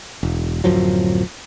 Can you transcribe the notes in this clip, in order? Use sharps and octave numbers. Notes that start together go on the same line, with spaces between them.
E1
D1 F#2 F3 F#3